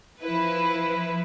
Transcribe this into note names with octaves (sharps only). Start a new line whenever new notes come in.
F3 E4 B4